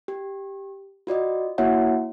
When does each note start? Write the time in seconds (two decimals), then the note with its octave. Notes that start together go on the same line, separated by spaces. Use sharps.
0.08 G4
1.07 F4 F#4 D5 D#5
1.58 A#3 E4 F#4 C#5 E5 F#5